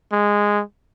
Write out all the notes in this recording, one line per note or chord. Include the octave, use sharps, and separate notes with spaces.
G#3